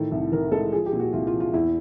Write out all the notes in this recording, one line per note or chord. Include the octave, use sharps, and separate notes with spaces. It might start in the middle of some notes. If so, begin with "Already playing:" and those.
Already playing: A2 D#3 A4
C2
D#3 A#4
G#3 A4
F3 G#4
G4
A#2
F#4
C2 F4
F4
F3
F4
E2 E4